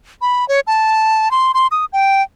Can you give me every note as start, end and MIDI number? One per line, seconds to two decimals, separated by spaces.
0.22 0.47 83
0.49 0.60 73
0.67 1.31 81
1.31 1.52 84
1.54 1.67 84
1.71 1.85 87
1.93 2.22 79